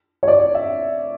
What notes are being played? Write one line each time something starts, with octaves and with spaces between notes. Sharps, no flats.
C#5
D5
E5